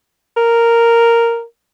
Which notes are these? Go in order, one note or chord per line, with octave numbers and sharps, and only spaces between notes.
A#4